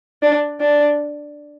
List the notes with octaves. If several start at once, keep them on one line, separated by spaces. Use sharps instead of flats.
D4
D4